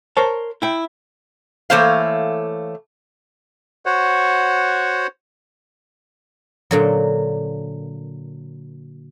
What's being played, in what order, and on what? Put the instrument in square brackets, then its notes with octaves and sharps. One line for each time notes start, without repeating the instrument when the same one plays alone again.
[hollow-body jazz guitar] A#4 C5 C#5 A5
E4 G5
[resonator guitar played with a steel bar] E3 A3 A#3 C5 C#5 F5
[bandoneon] F#4 C5 C#5 F#5
[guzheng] A#2 D3 F#3